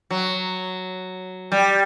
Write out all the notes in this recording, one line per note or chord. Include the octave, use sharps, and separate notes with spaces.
F#3
G3